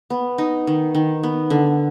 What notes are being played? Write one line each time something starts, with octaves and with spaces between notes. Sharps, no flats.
B3
D#4
D#3
D#3
B3
D3